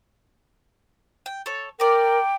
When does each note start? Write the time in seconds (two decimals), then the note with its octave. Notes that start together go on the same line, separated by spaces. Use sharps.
1.26 G5
1.46 A4 C#5
1.80 A#4 D5 G5 A#5